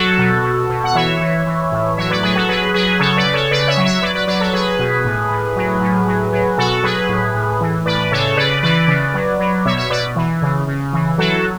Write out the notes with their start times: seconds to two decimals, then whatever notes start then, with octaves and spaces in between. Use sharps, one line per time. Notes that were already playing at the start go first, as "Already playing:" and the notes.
Already playing: F#3 F#4 A4
0.18 B2
0.43 B2
0.70 B2
0.84 F#5
0.95 E3 C#5 E5
1.21 E3
1.47 E3
1.72 A2
1.97 F#3 C#5 E5
2.10 B4 D5
2.23 F#3 G#4 B4
2.36 F#4 A4
2.48 F#3 G#4 B4
2.74 F#3 G#4 B4
3.00 C#3 A4 C#5
3.17 B4 D5
3.26 C#3
3.34 A4 C#5
3.51 C#3 B4 D5
3.68 C#5 E5
3.77 F#3
3.85 C#5 E5
4.02 F#3 B4 D5
4.15 B4 D5
4.27 F#3 B4 D5
4.40 A4 C#5
4.53 F#3 G#4 B4
4.79 B2
5.05 A2
5.30 A2
5.56 F#3
5.82 A2
6.07 F#3
6.32 F#3
6.58 B2 F#4 A4
6.83 F#3 G#4 B4
7.09 A2
7.35 A2
7.61 E3
7.86 A2 B4 D5
8.11 C#3 A4 C#5
8.37 C#3 B4 D5
8.63 E3 B4 D5
8.88 C#3
9.14 F#3
9.40 F#3
9.65 B2 C#5 E5
9.77 C#5 E5
9.90 B2 B4 D5
10.16 E3
10.42 C#3
10.67 C#3
10.93 E3
11.18 F#3 F#4 A4